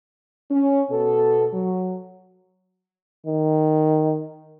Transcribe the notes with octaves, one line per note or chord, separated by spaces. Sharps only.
C#4
B2 A4
F#3
D#3